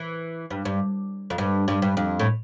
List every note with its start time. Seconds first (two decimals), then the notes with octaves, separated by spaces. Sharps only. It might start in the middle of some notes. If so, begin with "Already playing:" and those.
Already playing: E3
0.51 G2
0.65 G2
1.30 F2
1.38 G2
1.68 G2
1.82 G2
1.97 F2
2.19 A2